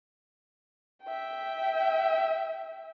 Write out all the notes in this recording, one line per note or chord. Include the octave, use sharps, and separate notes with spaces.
E5 G5